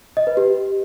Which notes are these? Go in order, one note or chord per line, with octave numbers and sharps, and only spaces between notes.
D#5
B4
G4